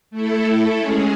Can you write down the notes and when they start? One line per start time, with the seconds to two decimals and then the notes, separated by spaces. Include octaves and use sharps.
0.11 A3 E4 A4
0.79 G#3 C#4 G#4